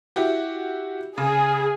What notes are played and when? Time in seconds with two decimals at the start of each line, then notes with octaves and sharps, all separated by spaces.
0.16 E4 F#4 G4
1.18 C#3 G#4